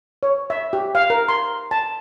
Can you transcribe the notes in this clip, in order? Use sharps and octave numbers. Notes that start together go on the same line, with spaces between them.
C#5
E5
G4
F5
A#4
C6
A5